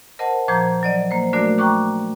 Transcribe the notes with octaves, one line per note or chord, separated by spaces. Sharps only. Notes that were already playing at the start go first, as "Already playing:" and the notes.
A#4 C5 D#5 F#5 A5
A#2 F3 C5 A#5 G6 G#6
F#3 D5 D#5
A#3 C5
A3 D4 F#4 A#4 D5
G5 A#5 C#6 D6 F#6